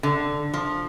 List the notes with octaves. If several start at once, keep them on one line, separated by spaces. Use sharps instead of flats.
D3
F3